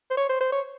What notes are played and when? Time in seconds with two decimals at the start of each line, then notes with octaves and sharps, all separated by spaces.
0.10 C5
0.17 C#5
0.29 C5
0.40 C5
0.52 C#5